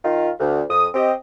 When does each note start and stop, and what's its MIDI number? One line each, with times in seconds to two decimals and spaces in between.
0.04 0.30 51
0.04 0.30 65
0.39 0.62 38
0.70 0.88 41
0.70 0.88 87
0.94 1.13 60
0.94 1.13 67
0.94 1.13 75